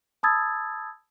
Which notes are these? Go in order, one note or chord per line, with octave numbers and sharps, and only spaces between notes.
A5 B5 D#6 E6 G#6 A6